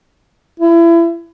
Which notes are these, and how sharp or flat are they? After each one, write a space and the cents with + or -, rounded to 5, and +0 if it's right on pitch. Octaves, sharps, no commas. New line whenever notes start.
E4 +30